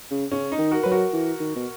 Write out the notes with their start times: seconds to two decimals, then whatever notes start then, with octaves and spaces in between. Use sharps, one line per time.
0.11 C#3
0.31 C#3 C#4
0.52 D#4
0.58 D#3
0.71 F#4 A#4
0.83 F#3 B4
0.92 F#4 A#4
1.13 E3
1.40 D#3
1.56 B2